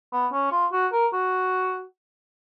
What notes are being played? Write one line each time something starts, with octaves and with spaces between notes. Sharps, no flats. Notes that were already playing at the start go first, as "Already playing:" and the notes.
B3
C#4
F4
F#4
A#4
F#4